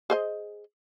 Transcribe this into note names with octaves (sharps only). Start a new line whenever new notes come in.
G#4 C5 D#5